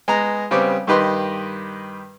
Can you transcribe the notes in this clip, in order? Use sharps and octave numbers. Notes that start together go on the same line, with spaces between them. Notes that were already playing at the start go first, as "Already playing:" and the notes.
G#3 B3 A#5
C#3 G3 B3 C4 D6
G2 D#3 G4 B4 D#5 C6